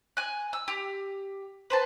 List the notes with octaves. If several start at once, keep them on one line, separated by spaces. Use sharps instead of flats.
G#5 F#6
E6
G4
B4 C5 A5